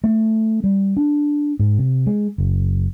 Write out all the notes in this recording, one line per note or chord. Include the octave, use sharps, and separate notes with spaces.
A3
G3
D4
G#2
C3
G#3
F#1